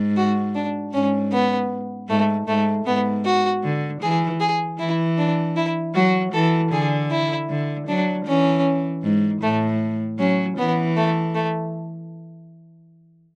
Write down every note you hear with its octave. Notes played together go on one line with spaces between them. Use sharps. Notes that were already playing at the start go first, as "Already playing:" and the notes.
Already playing: G#2
F#4
D4
G#2 C#4
B3
G#2 A3
G#2 A3
G#2 B3
F#4
D3
E3 G#4
G#4
E3 E4
D4
E4
F#3 F#4
E3 A4
D3 G#4
E4
D3
F#3 D4
E3 C#4
G#2
A2 A3
F#3 C#4
E3 B3
A3
A3